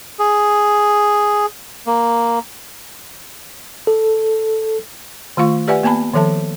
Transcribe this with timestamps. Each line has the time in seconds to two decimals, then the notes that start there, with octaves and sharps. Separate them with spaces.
0.19 G#4
1.87 A#3
3.87 A4
5.37 D#3 A3 F4 F5 C#6
5.68 G4 B4 D5 E5 F#5 G#5
5.83 A#3 B3 G#5 A5 B5
6.14 D#3 F3 A4 E5 A5